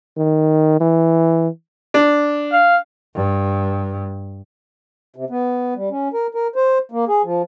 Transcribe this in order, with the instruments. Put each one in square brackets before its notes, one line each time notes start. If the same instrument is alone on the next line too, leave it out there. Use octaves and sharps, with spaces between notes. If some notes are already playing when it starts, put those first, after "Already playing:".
[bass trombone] D#3
E3
[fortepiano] D4
[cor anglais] F5
[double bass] G2
[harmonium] C3
B3
G3
C#4
A#4
A#4
C5
A#3
G#4
F3